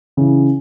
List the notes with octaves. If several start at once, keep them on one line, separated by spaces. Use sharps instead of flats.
C#3 E3